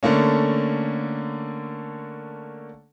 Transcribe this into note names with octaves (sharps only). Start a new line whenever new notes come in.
D3 A3 A#3 C#4